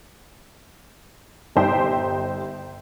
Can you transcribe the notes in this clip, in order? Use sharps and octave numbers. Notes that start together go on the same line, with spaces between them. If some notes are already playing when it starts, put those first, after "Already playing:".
G1 G3 D#4 C5 E5 G5